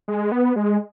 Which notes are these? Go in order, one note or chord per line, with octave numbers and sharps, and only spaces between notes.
G#3
B3
G#3